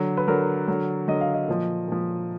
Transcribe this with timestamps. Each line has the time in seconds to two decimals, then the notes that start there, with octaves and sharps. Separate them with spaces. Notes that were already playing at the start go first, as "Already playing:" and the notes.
Already playing: D3 F#3
0.17 B4
0.28 D3 F#3 A#4
0.68 D3 F#3
1.08 D3 F#3 D#5
1.21 F5
1.34 D#5
1.48 A#2 F3
1.88 A#2 F3